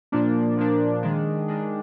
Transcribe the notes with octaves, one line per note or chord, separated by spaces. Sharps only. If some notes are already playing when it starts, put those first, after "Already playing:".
A#2 F3 A#3 D4
A#2 F3 A#3 D4
D#3 G#3 D4
D#3 G#3 D4